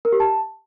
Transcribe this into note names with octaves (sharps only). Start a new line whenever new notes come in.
A#4
G4
A5